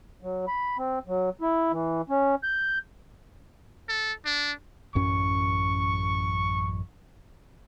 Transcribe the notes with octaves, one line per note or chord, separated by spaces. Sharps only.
F#3
B5
C4
F#3
E4
E3
C#4
G6
A4
D4
A1 F#2 C#4 C#6